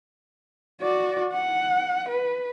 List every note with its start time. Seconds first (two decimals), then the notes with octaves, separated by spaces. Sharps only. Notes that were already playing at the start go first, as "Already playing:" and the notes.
0.82 F#4 D5
1.33 F#5
2.09 B4